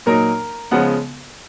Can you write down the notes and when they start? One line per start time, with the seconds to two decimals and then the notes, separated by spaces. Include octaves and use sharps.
0.06 A#2 F#3 A#3 D#4 A#4
0.71 C#3 F3 G#3 B3 F#5